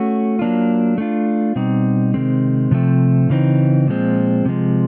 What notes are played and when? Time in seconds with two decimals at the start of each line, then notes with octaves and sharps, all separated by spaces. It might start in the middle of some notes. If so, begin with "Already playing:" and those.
Already playing: A3 C#4 F#4
0.39 F#3 A#3 D4 F4
0.98 A3 D4 F4
1.55 B2 G3 C4 D#4
2.14 C3 D#3 G#3 C4
2.71 C3 F3 A3 C4
3.30 C#3 E3 C4 D#4
3.88 A#2 F3 G#3 C4
4.46 C3 F3 G#3